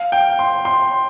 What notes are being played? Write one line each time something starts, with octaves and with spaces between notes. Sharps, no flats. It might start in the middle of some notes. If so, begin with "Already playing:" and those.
Already playing: F5
G5
C6
C6